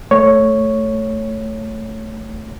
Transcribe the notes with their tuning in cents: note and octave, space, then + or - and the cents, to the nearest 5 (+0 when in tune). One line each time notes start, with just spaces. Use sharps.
A3 +0 C#5 +0